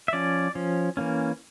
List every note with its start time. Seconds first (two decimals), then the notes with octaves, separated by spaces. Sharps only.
0.08 E5
0.13 F3 C#4 D5
0.55 F3 C#4
0.97 E3 A#3 C#4